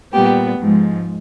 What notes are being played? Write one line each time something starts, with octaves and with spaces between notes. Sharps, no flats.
A#2 G3 B3 G4
G#2 F3 G#3